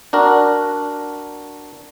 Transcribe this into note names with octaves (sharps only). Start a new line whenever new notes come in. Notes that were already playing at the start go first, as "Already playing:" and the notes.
D4 F#4 A#4